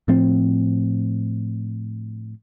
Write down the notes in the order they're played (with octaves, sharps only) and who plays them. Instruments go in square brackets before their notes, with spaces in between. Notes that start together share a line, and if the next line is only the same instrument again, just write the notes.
[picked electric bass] A2 F3 C4